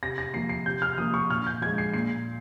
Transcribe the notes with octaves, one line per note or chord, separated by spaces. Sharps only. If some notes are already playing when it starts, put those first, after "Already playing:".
C3 A#6
A#6
F3 A#3 C7
C7
C3 G6
F6
F3 A#3 D#6
C#6
A#2 F6
G6
F3 G#3 G#6
C7
A#2 C7